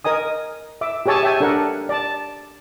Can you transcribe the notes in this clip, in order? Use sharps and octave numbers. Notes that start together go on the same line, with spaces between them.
A#4 D#5 G#5 D#6
E5 D6
G4 G#4 C#5 G#5 A5 E6
E5 G5 G#5
D4 A4 A#4 F#5
D5 A5